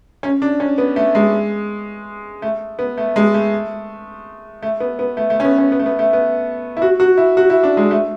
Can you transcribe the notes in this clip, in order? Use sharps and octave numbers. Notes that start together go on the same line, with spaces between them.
C#4
D4
C#4
B3
A3
G#3
A3
B3
A3
G#3
A3
A3
B3
B3
A3
A3
C#4
B3
C#4
B3
A3
B3
A3
B3
E4
F#4
F#4
E4
F#4
E4
D4
G#3
A3